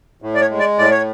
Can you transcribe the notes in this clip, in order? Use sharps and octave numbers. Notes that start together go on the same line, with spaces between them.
A2
D5
C#5
G#3
D5
A2 D5
C#5